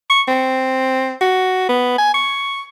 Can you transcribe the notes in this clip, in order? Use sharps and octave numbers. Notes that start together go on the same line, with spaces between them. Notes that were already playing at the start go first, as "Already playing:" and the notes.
C#6
C4
F#4
B3
G#5
C#6